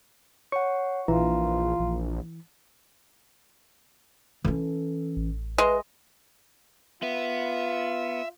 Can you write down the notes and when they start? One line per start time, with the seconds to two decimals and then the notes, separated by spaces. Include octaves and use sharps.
0.52 C#5 F#5 C#6
1.08 A#1 E3 F4 A#5
1.80 A#1
4.44 E3 C#4 A4
5.16 A1
5.58 G#3 B4 E5 A#6
7.03 B3 F4 E5